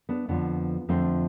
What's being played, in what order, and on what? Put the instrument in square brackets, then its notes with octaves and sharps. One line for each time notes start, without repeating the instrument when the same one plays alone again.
[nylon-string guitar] B3 D4
F2 D3 F3 B3 D4
F2 D3 F3 A3 C4